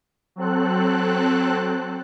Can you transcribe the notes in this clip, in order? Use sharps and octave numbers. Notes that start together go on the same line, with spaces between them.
F#3 C4 A4 F#6